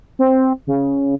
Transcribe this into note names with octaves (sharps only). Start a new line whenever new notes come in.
C4
C#3